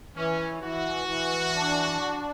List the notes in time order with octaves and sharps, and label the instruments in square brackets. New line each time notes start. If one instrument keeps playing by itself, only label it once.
[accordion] E3 [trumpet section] C#4
[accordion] E3 [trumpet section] F#4
[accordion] E3
D4